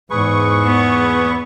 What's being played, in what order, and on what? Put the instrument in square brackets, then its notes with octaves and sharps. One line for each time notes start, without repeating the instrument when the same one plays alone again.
[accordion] E2 C#6 [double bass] G#2 [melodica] G#4 B4
[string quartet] B3